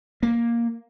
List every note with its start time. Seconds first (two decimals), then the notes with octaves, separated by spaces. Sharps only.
0.23 A#3